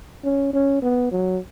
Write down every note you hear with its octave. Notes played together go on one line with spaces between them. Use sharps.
C#4
C#4
B3
F#3